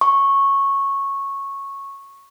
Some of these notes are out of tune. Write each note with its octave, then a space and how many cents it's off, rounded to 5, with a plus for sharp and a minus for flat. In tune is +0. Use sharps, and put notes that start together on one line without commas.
C#6 -10